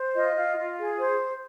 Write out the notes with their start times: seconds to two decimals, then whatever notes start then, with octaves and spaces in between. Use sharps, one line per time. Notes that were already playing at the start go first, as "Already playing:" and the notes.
Already playing: C5
0.15 F4 D#5
0.36 F4
0.58 F4
0.78 G#4
0.99 C5